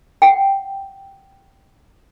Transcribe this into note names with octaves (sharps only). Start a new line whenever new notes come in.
F#5 G5